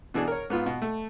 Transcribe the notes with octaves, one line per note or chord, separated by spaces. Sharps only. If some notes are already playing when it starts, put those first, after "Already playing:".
B2 E3 D4 G#4
A#4 C#5
G#2 B3 F4
B2
A3